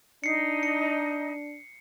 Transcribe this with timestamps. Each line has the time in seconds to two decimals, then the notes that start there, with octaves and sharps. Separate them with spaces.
0.24 D4 D#4 C7 C#7
0.63 C#7